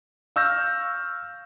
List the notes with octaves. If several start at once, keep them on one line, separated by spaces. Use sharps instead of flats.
F5 C#6 E6 F6 G6 A#6